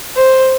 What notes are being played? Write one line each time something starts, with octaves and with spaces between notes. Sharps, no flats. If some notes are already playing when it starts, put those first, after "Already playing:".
C5